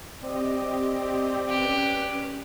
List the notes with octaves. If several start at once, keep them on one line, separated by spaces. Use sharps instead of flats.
C4 G4 D5 D#5
C#4 G4 B4 F#6